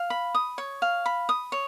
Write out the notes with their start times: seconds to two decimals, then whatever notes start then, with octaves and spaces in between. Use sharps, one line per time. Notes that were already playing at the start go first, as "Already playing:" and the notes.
Already playing: F5
0.10 B5
0.35 D#6
0.58 C#5
0.82 F5
1.06 B5
1.29 D#6
1.52 C#5